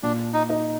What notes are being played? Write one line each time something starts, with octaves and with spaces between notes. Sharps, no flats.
A#2 D4
D#4
D#4